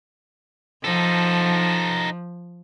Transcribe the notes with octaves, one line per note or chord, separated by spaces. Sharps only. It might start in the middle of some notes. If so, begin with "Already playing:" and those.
F3 D#4 A4